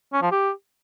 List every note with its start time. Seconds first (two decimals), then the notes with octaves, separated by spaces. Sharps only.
0.13 C#4
0.22 F3
0.32 G4